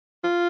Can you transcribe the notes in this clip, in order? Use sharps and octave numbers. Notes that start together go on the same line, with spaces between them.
F4